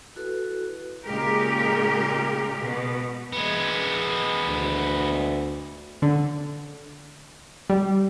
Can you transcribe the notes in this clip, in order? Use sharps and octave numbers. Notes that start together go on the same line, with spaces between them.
E4 F#4 A4 B4
A#2 C#3 G#3 G4 A#4
B2
G#3 B3
D2
D3
G3